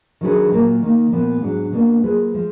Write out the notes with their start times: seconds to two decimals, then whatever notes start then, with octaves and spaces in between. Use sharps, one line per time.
0.21 D#3 F#3 D4 G#4 B4
0.51 A#2 F#3 A#3 F4 A#4
0.82 D#3 A#3 D#4
1.12 A#2 F3 B3
1.42 G#2 F#3 D4
1.73 B2 A#3 D4
2.03 F#3 A#3 F4 G#4 B4
2.34 F3 G#3